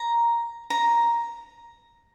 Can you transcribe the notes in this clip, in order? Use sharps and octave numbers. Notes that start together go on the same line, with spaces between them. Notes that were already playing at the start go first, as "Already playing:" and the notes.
Already playing: A#5
A#5